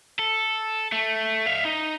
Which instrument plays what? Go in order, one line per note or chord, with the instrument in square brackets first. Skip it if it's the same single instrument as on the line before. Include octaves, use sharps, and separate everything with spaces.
[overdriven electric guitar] A4
A3
E5 F5
D#4